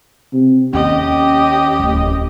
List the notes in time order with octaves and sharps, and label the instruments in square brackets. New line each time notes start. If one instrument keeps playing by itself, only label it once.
[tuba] C3
[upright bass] D#2 [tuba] C#4 [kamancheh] G4 D#5
[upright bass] D1 G1